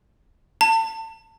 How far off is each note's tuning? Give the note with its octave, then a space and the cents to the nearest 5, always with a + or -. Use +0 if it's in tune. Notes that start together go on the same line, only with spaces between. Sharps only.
A5 +30